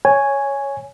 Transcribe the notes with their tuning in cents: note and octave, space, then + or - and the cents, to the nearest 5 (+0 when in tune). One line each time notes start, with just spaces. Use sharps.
C#5 +5 G#5 +0